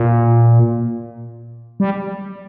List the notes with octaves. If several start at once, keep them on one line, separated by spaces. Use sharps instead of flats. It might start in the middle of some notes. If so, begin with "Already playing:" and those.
Already playing: A#2
G3